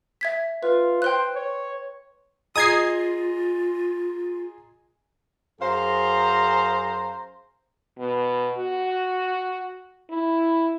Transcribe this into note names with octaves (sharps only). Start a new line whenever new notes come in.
E5 G#6 B6
F4 B4
C5 G5 C6 F#6
C#5
F4 G#4 D#5 A#5 D#6 G#6 C7
F#2 G#4 C5 F5 A#5
B2
F#4
E4